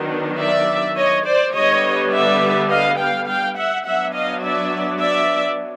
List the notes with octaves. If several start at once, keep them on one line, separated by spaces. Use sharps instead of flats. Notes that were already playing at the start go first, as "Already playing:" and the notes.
Already playing: D#3 F#3 B3 D4
D5 E5
C#5 D#5
C5 D5
D3 G3 B3 C#5 D#5
D5 E5
D#5 F5
F5 G5
F5 G5
E5 F#5
F#3 B3 D4 E5 F#5
D#5 F5
D5 E5
D5 E5